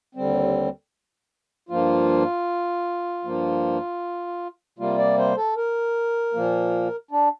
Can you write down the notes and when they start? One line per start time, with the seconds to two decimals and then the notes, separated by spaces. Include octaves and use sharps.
0.15 D#2 D3 G3 C4
1.69 G2 F3 A#3 F4
3.24 G2 F3 A#3
4.78 C3 G3 A#3 F4
4.98 D5
5.18 C5
5.37 A4
5.57 A#4
6.34 A#2 F3 A#3
7.11 D4